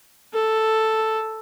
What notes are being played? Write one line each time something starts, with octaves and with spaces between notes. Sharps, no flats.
A4